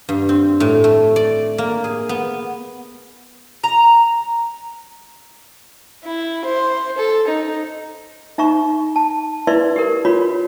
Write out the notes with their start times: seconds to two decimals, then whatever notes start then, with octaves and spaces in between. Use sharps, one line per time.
0.09 G2
0.29 C4
0.60 A2
0.84 A3
1.16 D5
1.58 A#3
1.84 G#4
2.09 B3
3.64 A#5
6.04 E4
6.45 C5
6.98 A4
7.28 D#4
8.38 D#4 E5 A#5 C#6
8.96 A5
9.47 E4 B4 D5 E5 C6
9.76 G4 A#4
10.05 F4 F#4 C#5 B5